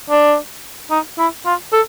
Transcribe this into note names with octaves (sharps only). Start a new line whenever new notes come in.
D4
D#4
E4
F4
A4